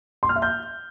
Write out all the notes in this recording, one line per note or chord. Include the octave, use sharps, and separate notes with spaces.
C6
F6
E5
G6